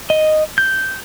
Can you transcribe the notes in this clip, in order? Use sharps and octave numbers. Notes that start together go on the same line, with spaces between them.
D#5
G6